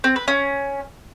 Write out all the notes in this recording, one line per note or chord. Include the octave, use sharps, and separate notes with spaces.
C4
B4
C#4